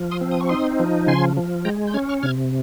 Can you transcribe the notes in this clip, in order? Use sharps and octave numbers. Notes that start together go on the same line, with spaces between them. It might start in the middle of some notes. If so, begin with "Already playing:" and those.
Already playing: F3
C6 D#6
C4
D#6
C#6
D#4 C6 D#6
F3
C#3 G#5 C6
F3
G#3 G5 A#5
G6
C#4 F6 G#6
C#6 F6
C3 F6 G#6